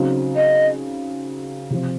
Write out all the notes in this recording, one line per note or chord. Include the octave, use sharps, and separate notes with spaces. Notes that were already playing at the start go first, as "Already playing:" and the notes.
Already playing: C#3 F#3 C4 D#4
D#5
C3 F3 C4